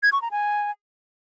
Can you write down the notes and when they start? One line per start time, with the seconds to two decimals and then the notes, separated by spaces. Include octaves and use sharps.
0.03 G#6
0.12 C#6
0.22 A#5
0.31 G#5